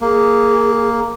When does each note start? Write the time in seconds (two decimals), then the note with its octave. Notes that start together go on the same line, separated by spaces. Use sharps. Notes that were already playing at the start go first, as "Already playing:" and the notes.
0.01 A#3 G#4